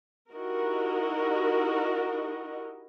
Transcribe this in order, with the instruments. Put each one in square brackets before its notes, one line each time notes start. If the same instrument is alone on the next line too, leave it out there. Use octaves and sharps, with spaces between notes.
[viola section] D#4 E4 F#4 G4 A#4 D#5